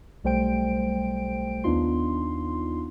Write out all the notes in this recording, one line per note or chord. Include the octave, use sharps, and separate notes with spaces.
B1 G3 A3 C5 G5 D7
D#2 B3 D4 D#4 F4 C6